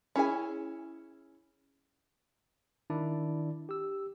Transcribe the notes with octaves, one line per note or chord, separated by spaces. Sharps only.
C#4 E4 G#4 G#5
D#3 D4 E4 D5
G4 E6